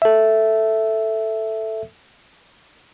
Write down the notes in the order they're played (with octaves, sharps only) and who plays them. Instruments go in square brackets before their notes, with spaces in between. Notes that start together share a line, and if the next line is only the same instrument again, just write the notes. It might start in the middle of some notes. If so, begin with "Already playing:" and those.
[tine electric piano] A4 E5